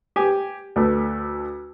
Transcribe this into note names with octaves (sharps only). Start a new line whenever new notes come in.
G4 G#5
D2 A3 B4